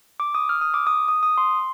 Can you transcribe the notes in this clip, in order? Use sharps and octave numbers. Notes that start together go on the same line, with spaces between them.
D6
D#6
F6
D#6
D6
D#6
D#6
D#6
C6